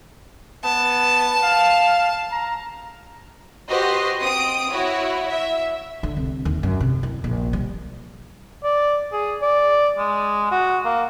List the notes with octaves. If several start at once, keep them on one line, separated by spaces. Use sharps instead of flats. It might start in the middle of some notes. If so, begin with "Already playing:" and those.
B3 A5
F5
A#5
F#4 G4 B4 C5 D#5 C6
C4 D#6 D7
E4 F#4 C#5
E5
D3
C2
D#2
F#2
C3
E4
A#1
G3
D5
G#4
D5
G#3
F#4
A#3